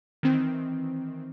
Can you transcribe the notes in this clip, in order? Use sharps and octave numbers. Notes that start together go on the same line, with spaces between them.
D#3 E3 C4